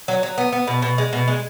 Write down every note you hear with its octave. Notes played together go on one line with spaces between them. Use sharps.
F#3
F#3
B3
B3
B2
B2
G#3
B2
G#3